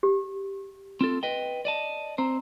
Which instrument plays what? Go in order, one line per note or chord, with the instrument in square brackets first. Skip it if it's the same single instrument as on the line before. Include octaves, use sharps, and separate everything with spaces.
[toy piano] G4
[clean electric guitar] C4 F4 A4
B4 D#5 G5
D5 D#5 A5
[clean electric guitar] C4 C5 [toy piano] A#5